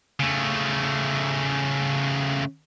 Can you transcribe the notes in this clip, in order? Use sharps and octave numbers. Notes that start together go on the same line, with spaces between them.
C#3 A3